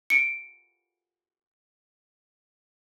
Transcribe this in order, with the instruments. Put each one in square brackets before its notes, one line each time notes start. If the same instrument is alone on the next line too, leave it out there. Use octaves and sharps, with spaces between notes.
[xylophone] C#7 D7